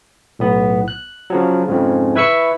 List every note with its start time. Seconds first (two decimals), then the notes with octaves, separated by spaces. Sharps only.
0.39 B1 A2 B3
0.88 F#6
1.30 C#3 F3 F#3
1.68 F2 G#2 C#3
2.15 E4 B4 E5 C#6 E6 C#7